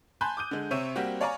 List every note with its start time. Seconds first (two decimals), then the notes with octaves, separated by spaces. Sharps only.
0.21 G#5 A5 B5 C6 F#6 G6
0.37 D6 D#6 G6 D#7
0.51 D3 G#3
0.71 C3 C4 C#5 E5 D#7
0.96 G3 A#3 C4 F#4 G4
1.21 C#5 D5 F5 G#5 A#5 C#6